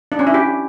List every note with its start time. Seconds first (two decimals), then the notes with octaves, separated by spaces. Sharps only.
0.12 D4
0.19 C#4
0.27 E4
0.34 G4